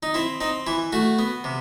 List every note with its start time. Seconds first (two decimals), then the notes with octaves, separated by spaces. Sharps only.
0.03 D#4
0.14 C4 E4
0.41 C4 D#4
0.67 E3 E4
0.92 A3 F#4
1.19 B3
1.44 C3